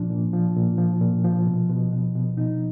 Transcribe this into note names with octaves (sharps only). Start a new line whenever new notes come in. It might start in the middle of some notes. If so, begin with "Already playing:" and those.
Already playing: A#2 F3 D4
A#2
F3
A#2
F3
A#2
F3
B2
B2
B2
B2
B2 D#4